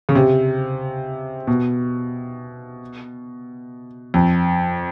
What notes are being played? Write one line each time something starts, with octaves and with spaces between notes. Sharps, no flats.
C#3
C3
B2
F2